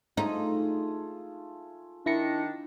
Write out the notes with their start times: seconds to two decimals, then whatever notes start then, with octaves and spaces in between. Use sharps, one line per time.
0.17 A3 D#4 F4 G#4
2.06 D#3 D4 E4 A#6 C#7